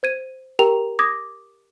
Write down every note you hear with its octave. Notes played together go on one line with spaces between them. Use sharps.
C5 G#6 D#7
G4 A#4 G5 A#5 F7
D6 D#6 G#6 A#6